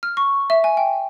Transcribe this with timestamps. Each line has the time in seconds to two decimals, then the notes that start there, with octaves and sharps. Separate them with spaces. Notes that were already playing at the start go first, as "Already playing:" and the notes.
0.03 F6
0.17 C#6
0.50 E5
0.64 G#5
0.77 G5